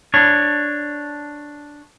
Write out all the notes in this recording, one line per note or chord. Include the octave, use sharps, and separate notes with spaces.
D4 C#5